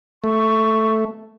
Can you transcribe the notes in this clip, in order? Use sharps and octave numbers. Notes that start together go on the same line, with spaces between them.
A3 C#6